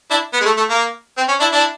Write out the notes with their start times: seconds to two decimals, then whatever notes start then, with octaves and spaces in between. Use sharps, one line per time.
0.11 D4 E4
0.33 B3
0.41 G#3
0.45 A3
0.57 A3
0.70 A#3
1.17 C4
1.28 C#4
1.40 D4 E4
1.52 D4 E4